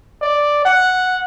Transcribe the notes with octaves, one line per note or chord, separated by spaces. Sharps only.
D5
F#5